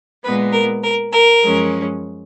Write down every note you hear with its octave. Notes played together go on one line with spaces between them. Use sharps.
A#2 G#3 B3 B4
A#4
A#4
A#4
F#2 F3 G#3 C#4